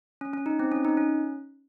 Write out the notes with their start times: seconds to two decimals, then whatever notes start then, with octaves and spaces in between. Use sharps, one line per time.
0.21 C#4
0.34 C#4
0.46 D#4
0.59 C4
0.72 C#4
0.85 D#4
0.97 C#4